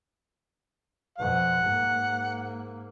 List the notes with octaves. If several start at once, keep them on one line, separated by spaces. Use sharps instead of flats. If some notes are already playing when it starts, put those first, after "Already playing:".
F2 B2 F#5
G#2 A#3